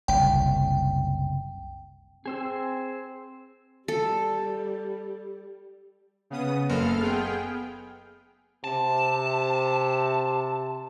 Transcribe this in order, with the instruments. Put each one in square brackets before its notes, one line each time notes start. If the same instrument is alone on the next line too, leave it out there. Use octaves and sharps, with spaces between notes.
[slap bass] F#1 C2 [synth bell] G5
[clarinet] C4 [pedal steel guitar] G#4 C5 E6
[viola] G3 G4 [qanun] A4
[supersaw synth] C#3 B3 D#6
[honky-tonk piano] F#1 [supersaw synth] A4 F5 F6
[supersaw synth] B3 G#4 G5 [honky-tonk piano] F6
[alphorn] C3 [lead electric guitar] A5